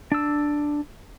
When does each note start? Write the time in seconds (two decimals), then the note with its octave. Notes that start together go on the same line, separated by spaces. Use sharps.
0.12 D4 E6